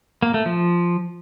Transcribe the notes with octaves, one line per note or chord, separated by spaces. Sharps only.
A#3
A3
F3